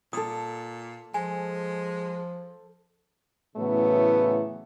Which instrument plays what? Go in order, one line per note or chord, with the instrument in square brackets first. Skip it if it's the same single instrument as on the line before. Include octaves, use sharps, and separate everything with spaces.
[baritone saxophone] A#2 [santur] A4 D6 [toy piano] D#6
[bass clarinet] F3 [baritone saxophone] G#3 [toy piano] G#5
[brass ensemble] A2 C#3 E3 F#3 A3 B3